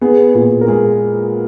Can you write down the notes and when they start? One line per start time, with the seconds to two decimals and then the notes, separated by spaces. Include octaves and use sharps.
0.01 B3 G#4
0.35 A#2
0.61 A#4
0.68 G#3 G#4